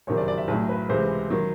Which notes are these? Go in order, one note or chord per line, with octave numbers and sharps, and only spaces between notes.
F#1 F2 C3 D#3 F#3 C#5
D5
D5
E5
B1 A2 F#3
B4
C#2 C3 E3 G#3 C5
D#3 F#3